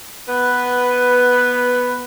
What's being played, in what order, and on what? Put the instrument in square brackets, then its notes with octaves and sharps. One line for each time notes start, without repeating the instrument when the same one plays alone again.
[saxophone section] B3 B4